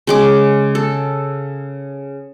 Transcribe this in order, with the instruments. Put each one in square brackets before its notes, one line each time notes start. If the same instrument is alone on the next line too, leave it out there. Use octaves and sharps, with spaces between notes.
[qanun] C#3 G#3 D6
A4